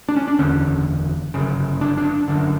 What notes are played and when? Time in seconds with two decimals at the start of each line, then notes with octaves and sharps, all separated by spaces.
0.09 D4
0.16 C#4
0.27 D4
0.39 F#1 E2 D3 C#4
1.34 G1 F#2 C#3
1.81 D4
1.98 D4
2.28 G1 F#2 D3